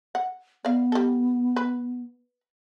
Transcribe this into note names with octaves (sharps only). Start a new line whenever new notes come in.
F#5
B3 D5 F5
G3 A4
B4